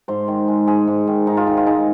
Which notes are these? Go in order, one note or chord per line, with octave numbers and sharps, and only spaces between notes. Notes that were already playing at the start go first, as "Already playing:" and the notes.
G#2 C5
D#3
G#3
G#2 G#4
G#2
D#3
G#2 D#4
F4
D#3 D#4
F4
G#3 D#4